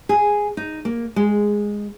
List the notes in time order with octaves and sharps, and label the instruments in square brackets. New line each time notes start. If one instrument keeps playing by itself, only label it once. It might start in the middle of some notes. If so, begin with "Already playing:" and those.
[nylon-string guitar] G#4
D#4
A#3
G#3